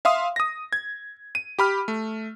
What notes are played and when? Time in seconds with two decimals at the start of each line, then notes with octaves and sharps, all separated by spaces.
0.05 E5 F5 C6 D#6
0.36 D#6 A#6
0.73 G#6
1.35 D#7
1.59 G4 B5 F6
1.88 A3